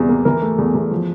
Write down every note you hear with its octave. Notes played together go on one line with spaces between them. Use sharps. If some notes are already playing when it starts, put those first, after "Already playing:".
Already playing: E2 C3 G3
A#3
E3 A#4
A3
E2
E2
F3